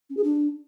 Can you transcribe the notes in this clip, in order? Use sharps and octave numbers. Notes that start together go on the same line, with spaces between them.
C#4
G#4
D4